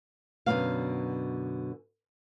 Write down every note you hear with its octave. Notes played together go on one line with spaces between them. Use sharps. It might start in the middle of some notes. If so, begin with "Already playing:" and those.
F#2 B2 D3 F#3 A#3 F5